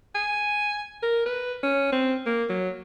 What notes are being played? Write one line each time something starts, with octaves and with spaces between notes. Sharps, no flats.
G#5
A#4
B4
C#4
C4
A#3
F#3